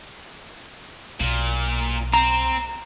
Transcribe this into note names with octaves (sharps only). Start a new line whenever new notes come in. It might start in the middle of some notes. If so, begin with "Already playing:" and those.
B1 A#2
C4 A#5